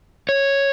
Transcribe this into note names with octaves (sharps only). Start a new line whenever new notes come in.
C#5